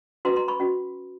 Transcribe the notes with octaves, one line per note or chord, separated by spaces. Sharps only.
C#4 F#4 B4 A#5 C6
A#5 C6
B5 C#6
C#4 F#4